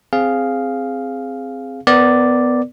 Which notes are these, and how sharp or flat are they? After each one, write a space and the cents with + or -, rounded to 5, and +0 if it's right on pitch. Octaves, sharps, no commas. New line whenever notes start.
C4 +0 G#4 +0 F5 +0
B3 +20 A#4 +0 D5 +0